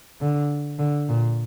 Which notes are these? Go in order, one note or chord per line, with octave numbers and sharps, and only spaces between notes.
D3
D3
A#2